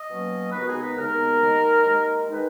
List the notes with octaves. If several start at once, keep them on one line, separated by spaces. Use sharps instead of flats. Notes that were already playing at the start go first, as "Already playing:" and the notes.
Already playing: D#5
B2 F#3 A#3 C#4
D#2 C#3 G#3 B3 D#4 B4
F#4
G#4
B4
D#2 C#3 G#3 B3 D#4 A#4
D#2 D#3 G#3 D#4
D#2 D#3 G#3 D#4
D#3 G#3 D#4 B4